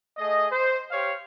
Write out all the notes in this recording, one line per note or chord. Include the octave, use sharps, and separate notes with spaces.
A3 G#4 D#5
C5
G4 C5 C#5 F5